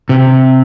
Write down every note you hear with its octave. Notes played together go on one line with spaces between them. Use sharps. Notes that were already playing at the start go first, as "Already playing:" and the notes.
C3